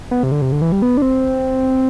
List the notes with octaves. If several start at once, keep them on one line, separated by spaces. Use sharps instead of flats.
B3
C3
D3
C3
D3
E3
G3
B3
D4
C4